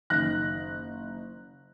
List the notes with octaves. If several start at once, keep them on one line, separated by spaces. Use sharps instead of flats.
F#1 D#3 D#4 F#6 A#6